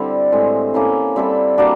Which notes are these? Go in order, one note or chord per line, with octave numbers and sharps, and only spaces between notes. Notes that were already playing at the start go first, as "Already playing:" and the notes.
Already playing: D3 G3 C4 E4
A2 E3 G#3 C4
A#3 C#4 E4 A4
G3 C4 E4 A4
G3 A#3 D4 F#4